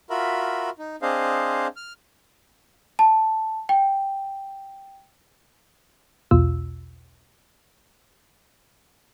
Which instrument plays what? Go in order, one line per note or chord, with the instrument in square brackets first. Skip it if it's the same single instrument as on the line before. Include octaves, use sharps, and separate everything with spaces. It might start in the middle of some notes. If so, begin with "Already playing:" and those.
[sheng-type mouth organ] F4 F#4 A#4 E5 B5
D#4
C4 D4 G#4 C5 D#5 F5
F6
[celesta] A5
G5
[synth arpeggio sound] B1 E2 B2 F4 E6